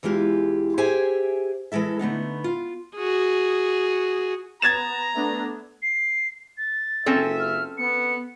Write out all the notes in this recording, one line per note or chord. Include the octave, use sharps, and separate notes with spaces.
E2 E3 G#3 F4 G4
G4 G#4 C5 E5 G5 G#5
E3 F3 G#3 A4 E5
D3 A3 B3 D#4
F4
F#4 G#4
B3 A#5 G#6 A6 E7
A3 B3 D4
C7
A6
F#1 C4 C#4 F4 A4 E5
F6
B3 C#7